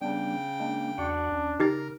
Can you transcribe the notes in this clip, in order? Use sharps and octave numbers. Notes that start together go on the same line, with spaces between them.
C#3 G3 B3 D4 G5
G#3 A#3 D4
E2 D4 F#4 F#5
D#2 C#4
C#3 D#4 G4 A#4 A6